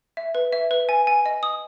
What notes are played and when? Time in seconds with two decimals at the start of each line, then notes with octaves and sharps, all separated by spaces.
0.17 E5
0.35 B4
0.52 E5
0.71 B4
0.89 G#5
1.07 G#5
1.26 D#5
1.43 D#6